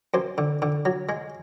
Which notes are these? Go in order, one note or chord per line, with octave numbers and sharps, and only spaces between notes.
F#2 C5
D3
D3
F#3
G#3